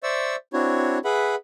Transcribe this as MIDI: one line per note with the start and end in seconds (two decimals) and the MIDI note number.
0.03 0.36 72
0.03 0.36 74
0.03 0.36 76
0.03 0.36 85
0.03 0.36 88
0.53 0.98 60
0.53 0.98 62
0.53 0.98 64
0.53 0.98 66
0.53 0.98 73
1.05 1.35 68
1.05 1.35 71
1.05 1.35 76
1.05 1.35 78
1.05 1.35 83